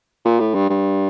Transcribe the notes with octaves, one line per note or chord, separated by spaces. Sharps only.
A#2
A2
G2
G2